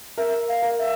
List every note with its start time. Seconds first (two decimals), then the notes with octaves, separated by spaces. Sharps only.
0.17 A#4 E5
0.48 F5
0.62 A#4
0.78 E5